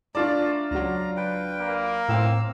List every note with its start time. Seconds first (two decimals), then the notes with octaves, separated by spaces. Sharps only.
0.15 A3 D4 F4 D5 A5 A#5
0.71 C#2 F#3 A#5
1.17 B4 G5
1.60 A#3
2.09 A2 C4 F5 E6